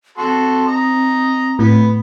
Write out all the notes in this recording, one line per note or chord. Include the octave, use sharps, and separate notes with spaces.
C4 F#4 A4 C6
D#5 A#5
A2 B3